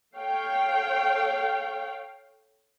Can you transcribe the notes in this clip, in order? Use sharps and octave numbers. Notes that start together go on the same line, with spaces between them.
A4 C#5 F5 G5